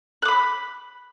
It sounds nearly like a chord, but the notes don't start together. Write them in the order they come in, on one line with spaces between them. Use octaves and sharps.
F#6 D6 B5